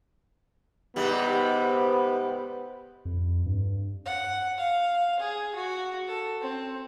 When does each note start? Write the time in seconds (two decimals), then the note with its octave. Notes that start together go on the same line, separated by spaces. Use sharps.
0.96 G#2 C3 G3 B3
3.05 F2
3.46 G2
4.05 F#5
4.58 F5
5.20 G#4
5.55 F#4
6.07 A4
6.41 C4